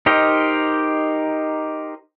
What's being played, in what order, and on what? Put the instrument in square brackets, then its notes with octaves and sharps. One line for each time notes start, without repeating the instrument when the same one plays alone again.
[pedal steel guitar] D#4 G4 A#4 C5 D#5